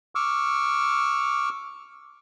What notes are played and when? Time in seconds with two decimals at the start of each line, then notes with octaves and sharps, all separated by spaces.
0.15 C#6 D6 E6 F6